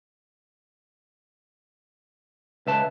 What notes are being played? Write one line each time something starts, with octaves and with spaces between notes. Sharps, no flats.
C#2 B4 E5 A5